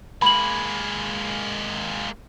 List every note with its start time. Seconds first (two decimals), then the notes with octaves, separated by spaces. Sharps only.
0.22 G#3 A#3 B5 F#7